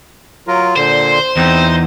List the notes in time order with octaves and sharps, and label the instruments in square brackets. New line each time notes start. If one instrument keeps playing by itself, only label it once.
[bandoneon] F#3 F4 [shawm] A#4
[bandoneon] A#2 D3 [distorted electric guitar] C5 [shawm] C6
[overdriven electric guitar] E2 [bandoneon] C4 [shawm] D#4